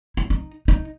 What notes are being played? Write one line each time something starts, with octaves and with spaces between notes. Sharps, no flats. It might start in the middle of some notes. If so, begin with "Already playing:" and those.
E4
D#4
D#4